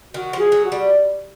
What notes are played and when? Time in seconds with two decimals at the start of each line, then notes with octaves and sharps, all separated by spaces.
0.13 D#3 F#4
0.33 F3
0.40 G#4
0.52 F#3
0.65 F#4
0.72 G3